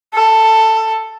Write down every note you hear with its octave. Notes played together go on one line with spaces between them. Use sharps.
A4